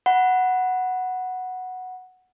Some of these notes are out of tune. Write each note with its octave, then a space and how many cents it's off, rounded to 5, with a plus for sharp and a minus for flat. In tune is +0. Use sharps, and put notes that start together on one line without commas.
F#5 +0 B5 -20